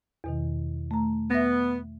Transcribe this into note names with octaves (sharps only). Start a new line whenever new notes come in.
E2 B2 D#3
A3 A#5
B3 E5 A#6